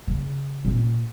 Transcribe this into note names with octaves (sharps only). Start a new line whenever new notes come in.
C#3
A#2 C#4